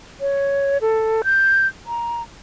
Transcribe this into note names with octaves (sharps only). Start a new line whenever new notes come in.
C#5
A4
G6
A#5